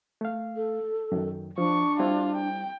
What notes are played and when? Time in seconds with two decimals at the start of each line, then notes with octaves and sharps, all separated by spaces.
0.21 A3 F5
0.56 A4
1.12 F#2 D#3
1.58 F3 D4 C#6
1.99 G3 C4 E4 F4
2.36 G5